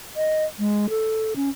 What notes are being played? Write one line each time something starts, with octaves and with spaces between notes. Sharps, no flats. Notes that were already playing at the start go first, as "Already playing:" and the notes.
D#5
G#3
A4
C#4